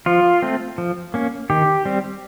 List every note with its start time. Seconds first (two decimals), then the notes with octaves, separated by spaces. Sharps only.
0.06 F3 F4
0.42 A3 C4
0.78 F3
1.14 A#3 C#4
1.50 D#3 G4
1.85 G3 C4